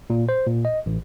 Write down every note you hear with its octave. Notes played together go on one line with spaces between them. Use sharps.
A#2
C5
A#2
D#5
A1